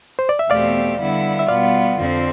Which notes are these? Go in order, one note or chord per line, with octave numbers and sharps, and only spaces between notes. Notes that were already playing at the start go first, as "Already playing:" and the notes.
C5
D5
E5
E2 B2 A3 C4 G4 D5 F5
D3 G3 B3 E4
E5
B2 G3 B3 F4 D5 F5
F2 D3 F3 C4